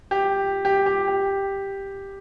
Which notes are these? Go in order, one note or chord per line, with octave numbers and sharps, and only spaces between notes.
G4
G4
G4
G4